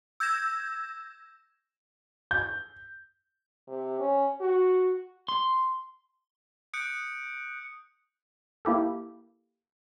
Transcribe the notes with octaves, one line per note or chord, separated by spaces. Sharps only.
E6 G6 G#6 A#6 E7
G6
C3
C#4
F#4
C6
D#6 F#6 G6 C#7 D7
A#3 E4 G4 A4